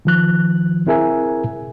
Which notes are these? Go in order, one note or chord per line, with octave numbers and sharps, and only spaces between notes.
D#3 F3 F#6
C4 E4 G#4 A#4 E5 G#5